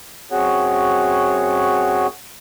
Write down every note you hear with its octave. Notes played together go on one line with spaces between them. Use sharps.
F#2 C4 F#4 G#4 C#5 F#5